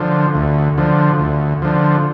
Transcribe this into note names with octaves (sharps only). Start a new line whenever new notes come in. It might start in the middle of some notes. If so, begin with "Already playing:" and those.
Already playing: D3 F3
D2
D3 F3
D2
D3 F3